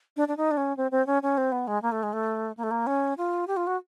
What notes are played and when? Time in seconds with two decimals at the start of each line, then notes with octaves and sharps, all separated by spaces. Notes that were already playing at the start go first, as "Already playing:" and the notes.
0.17 D4
0.28 D4
0.37 D#4
0.51 D4
0.57 C#4
0.77 C4
0.91 C4
1.07 C#4
1.22 C#4
1.37 C4
1.52 B3
1.67 G#3
1.82 A#3
1.92 A3
2.03 G#3
2.13 A3
2.57 A#3
2.63 A3
2.71 A#3
2.87 C#4
3.17 F4
3.47 G4
3.57 F4
3.67 F#4